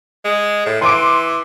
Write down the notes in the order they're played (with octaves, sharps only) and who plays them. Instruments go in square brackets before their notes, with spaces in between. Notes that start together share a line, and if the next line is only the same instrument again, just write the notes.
[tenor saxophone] G#3
A2
[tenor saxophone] E3 [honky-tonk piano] C6 D6 D7